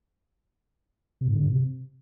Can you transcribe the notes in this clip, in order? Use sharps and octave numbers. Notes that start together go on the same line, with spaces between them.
C3
G#2
D3
G#2
C3